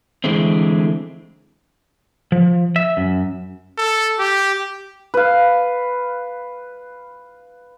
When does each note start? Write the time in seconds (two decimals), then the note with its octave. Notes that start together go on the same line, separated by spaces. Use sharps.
0.24 D3 E3 G#3 A3 C4
2.32 F3
2.76 E5
2.97 F#2
3.78 A4
4.19 G4
5.14 B4 F5